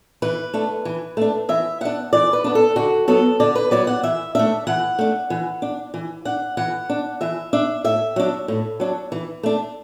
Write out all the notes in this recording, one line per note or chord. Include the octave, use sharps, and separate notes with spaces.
E3 B4
A3 D4
E3
A3 D4
E3 E5
B3 D4 F#5
E3 D5
B4
B3 D4
A4
D3 F#4
F#3 B3 A4
D3 D5
B4
F#3 B3 D5
F#5
E3 E5
A3 D4 E5
E3 F#5
A3 D4
E3
D4
E3
D4 F#5
E3 F#5
D4
E3 E5
D4 E5
A2 E5
F#3 D4
A2
F#3 D4
E3
A3 D4